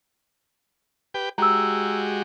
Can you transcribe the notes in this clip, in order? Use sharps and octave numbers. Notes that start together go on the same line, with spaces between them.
G4 B4 G5
G#3 F#4 G4 A#5 E6